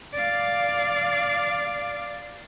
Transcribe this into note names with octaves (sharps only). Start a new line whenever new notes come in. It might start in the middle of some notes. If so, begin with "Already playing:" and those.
D5 F5